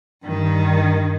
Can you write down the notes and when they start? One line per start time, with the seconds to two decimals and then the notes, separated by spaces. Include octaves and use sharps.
0.24 G2 D#3